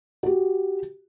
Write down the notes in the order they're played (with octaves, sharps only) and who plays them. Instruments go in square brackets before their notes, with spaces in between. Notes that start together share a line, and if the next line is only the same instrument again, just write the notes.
[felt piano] F#4 G4